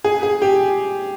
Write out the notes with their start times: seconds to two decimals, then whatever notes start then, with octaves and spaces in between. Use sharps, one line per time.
0.04 G#4
0.23 G#4
0.42 G4